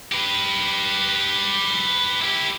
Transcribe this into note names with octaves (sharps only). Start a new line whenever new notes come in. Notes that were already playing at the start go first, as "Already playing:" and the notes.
G4 B4
E4 G4